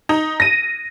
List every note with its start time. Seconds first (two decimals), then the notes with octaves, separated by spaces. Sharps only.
0.09 D#4
0.40 A#6 D#7